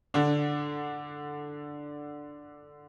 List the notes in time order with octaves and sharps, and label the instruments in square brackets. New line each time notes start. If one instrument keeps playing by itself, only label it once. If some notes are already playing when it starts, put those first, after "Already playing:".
[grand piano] D3 D4